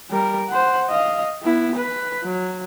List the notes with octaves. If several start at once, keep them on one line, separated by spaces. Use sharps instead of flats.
G3 A#4
C5 F#5
D#5 F5
B3 E4
B4
F#3